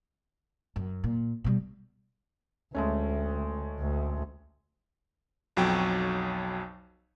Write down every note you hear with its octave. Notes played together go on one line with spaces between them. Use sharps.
F#2
A#2
B2 G3
D2 G#3 A3 C#4
D2
B1 F2 F#3 G5